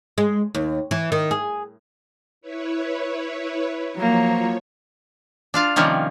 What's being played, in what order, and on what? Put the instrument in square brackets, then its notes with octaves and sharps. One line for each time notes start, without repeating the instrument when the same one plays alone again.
[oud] G#3
D#2
E3
D#3
G#4
[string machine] E4 B4 C#5
[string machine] F3 C#5 [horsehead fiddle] F#3 A#3
[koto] D4 F4 F5
C3 D#3 F3 G3 A#3 C#4